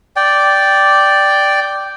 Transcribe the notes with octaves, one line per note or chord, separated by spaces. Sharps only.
D5 G5